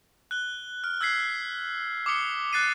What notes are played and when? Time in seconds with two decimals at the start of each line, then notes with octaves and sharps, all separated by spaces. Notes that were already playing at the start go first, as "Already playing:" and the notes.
0.31 F#6 G7
0.84 F6
1.01 E6 F#6 G#6 B6 C7
2.06 D6 D#6 C#7 G7
2.53 F#6 A6 C7 D#7